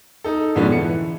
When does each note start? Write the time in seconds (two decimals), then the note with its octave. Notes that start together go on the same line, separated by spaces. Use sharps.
0.24 D#4 A4
0.55 F2 G#2 D3 F3 B3 C#4
0.70 E3 C#7